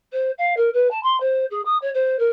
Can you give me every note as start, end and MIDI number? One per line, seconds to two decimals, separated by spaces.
0.12 0.30 72
0.38 0.53 77
0.56 0.69 70
0.73 0.87 71
0.90 1.01 81
1.02 1.18 84
1.20 1.45 72
1.50 1.61 68
1.65 1.77 87
1.81 1.89 73
1.94 2.18 72
2.18 2.30 70